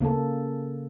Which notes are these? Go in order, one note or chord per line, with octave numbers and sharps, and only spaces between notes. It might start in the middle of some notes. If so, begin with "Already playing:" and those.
C#3 A#3 C#4 A4